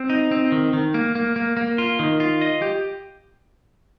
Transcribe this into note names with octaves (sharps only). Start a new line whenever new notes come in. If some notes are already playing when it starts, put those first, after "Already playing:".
Already playing: C4
D#4
C4
D#3
D#3
A#3
A#3
A#3
A#3
F4
D#3
F4
D#5
G4